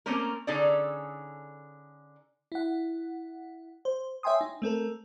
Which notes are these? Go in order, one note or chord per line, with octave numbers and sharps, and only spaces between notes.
A3 A#3 C4 C#4 A#4
D3 C#4 D#4 G#4 A4 D5
E4 F#5
C5
C#5 E5 G5 G#5 C6 D#6
D#4
A3 C4 A4 A#4